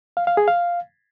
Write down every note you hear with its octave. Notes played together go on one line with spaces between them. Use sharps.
F5
F5
G#4
F5